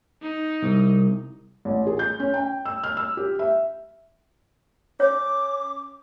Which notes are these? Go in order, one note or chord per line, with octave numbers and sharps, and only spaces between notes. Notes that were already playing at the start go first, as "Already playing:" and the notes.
D#4
C2
A1
G#4
G6
C#4
G5
E6
F6
E6
G4
E5
C#4 C#5 D6